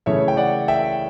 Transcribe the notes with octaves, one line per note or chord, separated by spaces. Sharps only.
C#3 E3 A3 C#5 E5
G5
D5 F#5
E5 G5